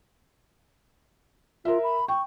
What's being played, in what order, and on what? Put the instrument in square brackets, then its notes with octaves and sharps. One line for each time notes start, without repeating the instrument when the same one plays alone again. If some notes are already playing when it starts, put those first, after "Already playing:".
[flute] F4 [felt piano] A#4 E5
[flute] B5
[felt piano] G5 [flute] C#6